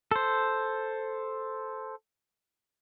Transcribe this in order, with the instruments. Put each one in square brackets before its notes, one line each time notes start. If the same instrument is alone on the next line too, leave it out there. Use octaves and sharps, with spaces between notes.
[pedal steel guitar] A4 C5